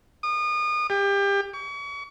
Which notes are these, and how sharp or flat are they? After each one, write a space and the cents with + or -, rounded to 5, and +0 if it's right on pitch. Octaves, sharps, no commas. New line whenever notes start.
D#6 -35
G4 +30
C#6 +40